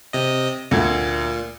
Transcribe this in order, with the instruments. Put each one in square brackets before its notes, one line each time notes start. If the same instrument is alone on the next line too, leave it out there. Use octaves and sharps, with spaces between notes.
[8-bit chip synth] C3 D#5
[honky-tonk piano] D2 A4 G#6 [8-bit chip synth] A#2